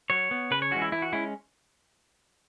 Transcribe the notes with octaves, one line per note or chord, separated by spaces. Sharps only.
F#3 C#5
B3
C#3 B4
C#5
E3 G#3 C#4 F#4
E4
E3 E4
F#4
G#3 C#4 E4